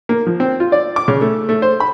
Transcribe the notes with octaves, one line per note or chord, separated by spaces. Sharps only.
A#3
F3
C4
F4
D5
D6
C#3
A3
A3
C5
B5